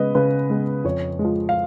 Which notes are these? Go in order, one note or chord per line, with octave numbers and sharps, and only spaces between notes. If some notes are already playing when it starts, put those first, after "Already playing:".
Already playing: C#3 G#3 B3 B4 D#5
C#3 B4
G#3 B3
F2 C#5
G#3
F3
F5